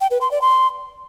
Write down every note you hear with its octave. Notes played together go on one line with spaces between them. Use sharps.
G5
B4
C6
D5
C6